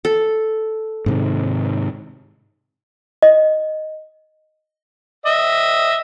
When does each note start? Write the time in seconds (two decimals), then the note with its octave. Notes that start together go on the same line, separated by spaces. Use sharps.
0.05 A4
1.06 G#2 C3 D#3
3.22 D#5
5.26 D#5 E5